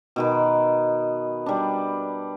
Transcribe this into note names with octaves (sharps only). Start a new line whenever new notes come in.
B2 D#3 B4
G3 D4